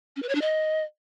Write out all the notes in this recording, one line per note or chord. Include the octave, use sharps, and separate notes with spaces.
C#4
B4
C#5
D4
D#5